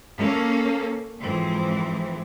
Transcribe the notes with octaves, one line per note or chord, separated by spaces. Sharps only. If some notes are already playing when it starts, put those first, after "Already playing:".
A#3 C#4 A4
F2 G#2 E3 C4